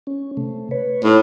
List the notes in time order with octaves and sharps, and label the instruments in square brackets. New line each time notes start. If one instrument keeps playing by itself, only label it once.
[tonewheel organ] C#4
C3 A3
B4 C#5
[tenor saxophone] A2 [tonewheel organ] D#4